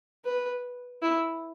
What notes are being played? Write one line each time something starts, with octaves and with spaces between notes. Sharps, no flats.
B4
E4